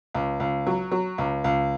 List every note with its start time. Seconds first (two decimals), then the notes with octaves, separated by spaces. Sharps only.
0.14 C#2
0.40 C#2
0.67 F#3
0.91 F#3
1.18 C#2
1.44 C#2